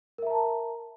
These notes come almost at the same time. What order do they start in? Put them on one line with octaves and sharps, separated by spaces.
A#4 E5 A#5 A5